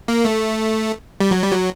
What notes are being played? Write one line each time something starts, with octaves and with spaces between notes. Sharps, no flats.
A#3
A3
G3
F#3
G3
F#3